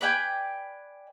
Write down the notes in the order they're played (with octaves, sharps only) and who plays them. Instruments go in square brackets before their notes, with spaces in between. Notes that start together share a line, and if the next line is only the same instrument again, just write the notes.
[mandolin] B4 D5 G5 G#5